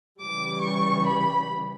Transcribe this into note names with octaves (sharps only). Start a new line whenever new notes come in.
C#3 E3 G3 D6
C#6
B5